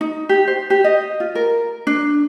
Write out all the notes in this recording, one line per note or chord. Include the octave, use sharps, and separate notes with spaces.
D#4
G4
C5
G4
D#5
F4
A#4
D4